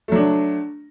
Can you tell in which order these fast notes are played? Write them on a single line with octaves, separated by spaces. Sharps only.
A3 F#3 D4